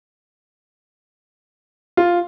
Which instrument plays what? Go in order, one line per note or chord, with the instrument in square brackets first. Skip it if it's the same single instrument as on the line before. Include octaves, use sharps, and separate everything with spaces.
[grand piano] F4